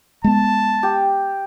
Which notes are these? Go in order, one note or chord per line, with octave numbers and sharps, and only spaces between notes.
G#3 B3 A5
G4